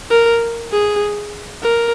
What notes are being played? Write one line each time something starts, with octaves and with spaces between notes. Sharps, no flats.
A#4
G#4
A#4